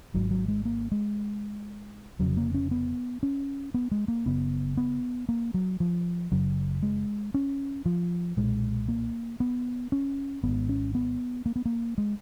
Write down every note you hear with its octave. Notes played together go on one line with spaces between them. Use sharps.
G#1 G#2 F#3
F#3
G#3
A#3
G#3
F1 F2 C#3 F#3
A#3
C#4
B3
C#4
B3
G#3
A#3
F#1 F#2 C#3 B3
B3
A#3
F#3
F3
F#1 F#2 C#3 F#3
G#3
C#4
F3
B1 A#2 G#3
A#3
B3
C#4
G#1 G#2 B3
C#4
B3
A#3
B3
A#3
G#3